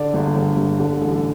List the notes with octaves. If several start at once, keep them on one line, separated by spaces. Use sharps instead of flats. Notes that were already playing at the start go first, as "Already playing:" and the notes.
Already playing: D3 D5
G1
G1
G2
D3
A1